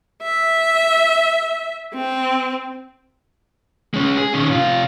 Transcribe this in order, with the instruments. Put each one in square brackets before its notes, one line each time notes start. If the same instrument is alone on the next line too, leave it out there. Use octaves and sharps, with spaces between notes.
[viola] E5
C4
[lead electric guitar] G#3 C#4
G#4
D#3 C#4
C3 F4